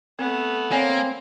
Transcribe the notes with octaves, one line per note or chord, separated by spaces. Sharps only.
A3 B3 C4
A#3 C4 C#5 D5 G#5